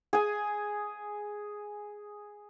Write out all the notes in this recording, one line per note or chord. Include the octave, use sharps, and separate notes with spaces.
G#4 G#5